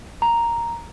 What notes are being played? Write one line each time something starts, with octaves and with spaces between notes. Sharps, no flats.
A#5